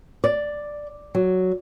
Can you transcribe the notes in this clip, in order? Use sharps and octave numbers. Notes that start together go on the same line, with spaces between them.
D5
F#3